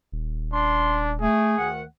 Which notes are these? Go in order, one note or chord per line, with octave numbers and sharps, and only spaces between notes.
D#1
D4 C6
A3 G#4
D2 D#3 F#5